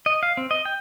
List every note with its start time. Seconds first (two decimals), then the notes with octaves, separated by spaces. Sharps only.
0.06 D#5
0.23 F5
0.37 C4
0.51 D#5
0.65 G5